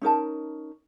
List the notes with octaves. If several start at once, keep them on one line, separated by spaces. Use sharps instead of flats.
C#4 D#4 A#4 A5